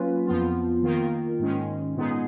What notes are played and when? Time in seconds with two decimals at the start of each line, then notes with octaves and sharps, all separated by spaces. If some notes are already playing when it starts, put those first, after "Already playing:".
Already playing: F#3 A#3 C#4 F4 B4
0.26 F2 F3 B3 F4
0.83 D#3 A#3 F4 A#4
1.39 G#2 D#3 G#3 C#4
1.96 A#2 G#3 B3 D#4 G#4